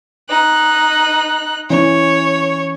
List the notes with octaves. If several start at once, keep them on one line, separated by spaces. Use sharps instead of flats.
D#4 F#6
E3 C#4 C#5